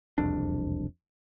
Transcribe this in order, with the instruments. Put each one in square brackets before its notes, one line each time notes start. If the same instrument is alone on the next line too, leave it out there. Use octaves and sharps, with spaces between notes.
[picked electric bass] E1 C2 F2 D4